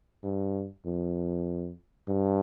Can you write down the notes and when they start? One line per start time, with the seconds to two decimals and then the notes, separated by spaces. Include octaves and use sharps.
0.24 G2
0.86 F2
2.09 G2